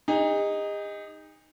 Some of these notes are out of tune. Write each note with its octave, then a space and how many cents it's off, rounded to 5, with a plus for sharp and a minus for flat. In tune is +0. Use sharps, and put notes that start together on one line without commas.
D#4 +0 G#4 -45